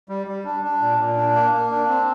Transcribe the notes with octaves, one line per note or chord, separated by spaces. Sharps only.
G3
G3
D4
D4
A#2
A#2
D4
A#3
A#3
D4
C4